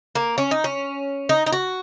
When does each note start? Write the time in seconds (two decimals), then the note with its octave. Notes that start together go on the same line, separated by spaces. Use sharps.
0.15 A#3
0.38 C#4
0.51 D#4
0.64 C#4
1.29 D#4
1.46 D#4
1.52 F#4